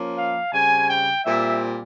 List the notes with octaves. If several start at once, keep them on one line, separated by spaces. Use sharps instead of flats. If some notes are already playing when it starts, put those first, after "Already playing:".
Already playing: F3 A#3 C#4
F5
C#3 G3 C4 G#5
G5
A#2 G3 C4 E5